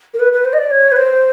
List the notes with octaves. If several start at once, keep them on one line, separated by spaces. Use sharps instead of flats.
A#4
B4
B4
C5
D#5
D5
C#5
B4
C5